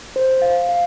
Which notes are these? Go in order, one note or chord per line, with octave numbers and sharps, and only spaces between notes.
C5
F5
F5